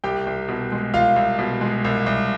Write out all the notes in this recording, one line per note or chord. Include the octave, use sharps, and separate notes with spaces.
C2 G4 G5
C2
B2
G#3
C2 F4 F5
C2
B2
G#3
C2
C2